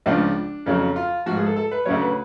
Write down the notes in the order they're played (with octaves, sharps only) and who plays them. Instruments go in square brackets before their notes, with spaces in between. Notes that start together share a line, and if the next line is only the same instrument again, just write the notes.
[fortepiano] C#2 C#3 F3 D4
F2 C#3 F#3
F4
F3 F#4
G#2
G#4
A4
A4
B4
D2 C#3 F#3 C#5
B4